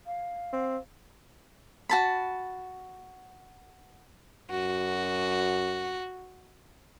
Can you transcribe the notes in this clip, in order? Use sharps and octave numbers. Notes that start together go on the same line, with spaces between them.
F5
C4
F#4 A5 B5
F#2 F#4